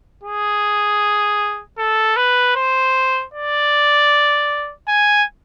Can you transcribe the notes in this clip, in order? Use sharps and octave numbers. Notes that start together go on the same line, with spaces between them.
G#4
A4
B4
C5
D5
G#5